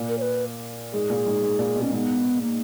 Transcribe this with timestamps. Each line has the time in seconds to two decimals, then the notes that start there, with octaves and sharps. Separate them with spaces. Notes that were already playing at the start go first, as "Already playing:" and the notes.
Already playing: A#2
0.09 A#4
0.18 C#5
0.22 B4
0.93 G#2 G#4
1.10 A#2
1.26 G#2
1.42 G#2
1.59 A#2
1.76 B2
1.82 C#4
1.92 G#2 B3
2.42 A#3